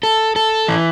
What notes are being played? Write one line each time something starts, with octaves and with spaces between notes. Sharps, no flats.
A4
A4
E3